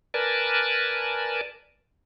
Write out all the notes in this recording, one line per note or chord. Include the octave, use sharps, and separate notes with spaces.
A#4 B4 D5 G#5 A5